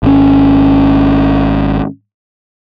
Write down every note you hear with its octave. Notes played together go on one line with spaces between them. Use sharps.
G#1 C#4